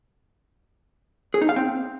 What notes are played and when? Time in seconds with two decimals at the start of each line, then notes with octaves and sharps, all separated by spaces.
1.34 G#4
1.41 D#4
1.49 F5
1.56 C4